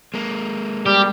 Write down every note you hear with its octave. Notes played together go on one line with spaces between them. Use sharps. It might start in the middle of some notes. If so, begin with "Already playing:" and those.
G#3 A#3
G3 G4